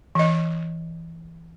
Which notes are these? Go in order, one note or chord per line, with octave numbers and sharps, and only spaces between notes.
E3 D#5